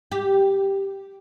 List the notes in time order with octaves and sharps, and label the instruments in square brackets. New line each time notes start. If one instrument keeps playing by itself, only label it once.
[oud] G4